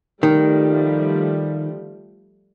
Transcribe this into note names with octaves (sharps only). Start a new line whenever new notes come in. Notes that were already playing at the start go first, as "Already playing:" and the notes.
D#3 F3 G3 A3